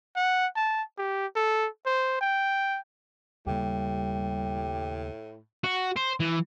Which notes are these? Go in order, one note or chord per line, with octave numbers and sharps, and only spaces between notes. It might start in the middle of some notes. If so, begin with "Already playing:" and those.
F#5
A5
G4
A4
C5
G5
D#2 A2 C#3 G3 A#3 G4
F#4
C5
E3